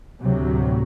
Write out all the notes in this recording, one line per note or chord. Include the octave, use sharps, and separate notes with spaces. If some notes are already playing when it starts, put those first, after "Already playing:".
D2 A2 C3 F#3